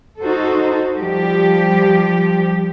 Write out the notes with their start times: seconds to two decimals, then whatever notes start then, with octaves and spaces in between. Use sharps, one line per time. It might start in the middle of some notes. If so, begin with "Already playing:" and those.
0.22 D#4 F#4 A4 C5
0.97 F3 G3 G4